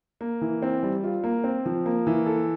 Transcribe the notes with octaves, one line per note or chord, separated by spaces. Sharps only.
A#3
E3
C4
G3
F4
A#3
C4
F3
A#3
E3
A4